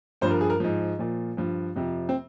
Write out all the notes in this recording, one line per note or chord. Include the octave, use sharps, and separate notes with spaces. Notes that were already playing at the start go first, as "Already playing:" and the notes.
G2 F3 C5
A#4
G#4
A#4
G#2 F3
A#2 F3
G2 F3
F2 C3 F3
C4